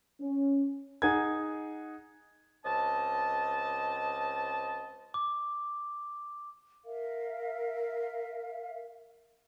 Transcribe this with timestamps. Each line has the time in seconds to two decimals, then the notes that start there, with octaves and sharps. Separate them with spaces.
0.20 C#4
1.02 D#4 G#4 F#5 G#6
2.65 C#2 C4 D#5 A5
5.14 D6
6.84 A#4 E5 F5